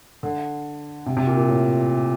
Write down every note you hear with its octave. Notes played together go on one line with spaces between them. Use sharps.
D3
C3
C3
A#2
A#2
A2